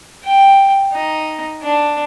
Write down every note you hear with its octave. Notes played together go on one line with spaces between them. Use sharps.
G5
D#4
D4